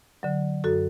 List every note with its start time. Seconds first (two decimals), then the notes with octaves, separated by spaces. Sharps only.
0.23 D3 F#3
0.64 F#2 F#4 A4